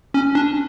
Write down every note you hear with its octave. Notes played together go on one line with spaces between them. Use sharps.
C#4
D4